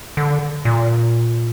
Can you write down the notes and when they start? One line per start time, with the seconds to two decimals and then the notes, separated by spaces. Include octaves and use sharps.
0.17 D3
0.65 A#2